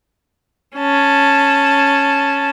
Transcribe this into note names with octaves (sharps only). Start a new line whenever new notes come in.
C#4 A5